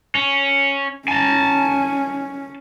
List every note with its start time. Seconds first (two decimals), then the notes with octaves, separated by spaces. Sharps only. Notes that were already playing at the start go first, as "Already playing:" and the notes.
0.15 C#4
1.08 C#4 G#5 A5